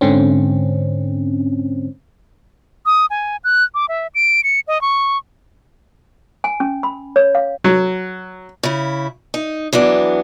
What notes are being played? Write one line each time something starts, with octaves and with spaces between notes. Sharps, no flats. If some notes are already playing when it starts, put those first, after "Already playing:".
G#2 D3 C4 C#4
D#6
G#5
F#6
D6
E5
D7
C#7
D#5
C#6
G#5
C#4
B5
C#5
F5
F#3
C#3 E4
D#4
E3 F#3 B3 D4